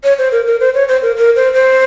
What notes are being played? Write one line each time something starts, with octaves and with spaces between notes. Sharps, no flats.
C#5
C5
A#4
A#4
C5
C#5
C5
A#4
A#4
C5
C5